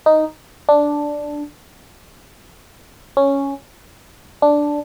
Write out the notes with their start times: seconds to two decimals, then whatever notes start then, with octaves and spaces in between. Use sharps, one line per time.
0.06 D#4
0.69 D4
3.17 C#4
4.42 D4